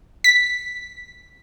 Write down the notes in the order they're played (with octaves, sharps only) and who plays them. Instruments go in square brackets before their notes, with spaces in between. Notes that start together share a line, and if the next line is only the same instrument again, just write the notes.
[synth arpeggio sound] B6